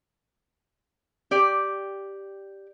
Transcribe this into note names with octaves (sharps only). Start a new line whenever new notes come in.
G4 D5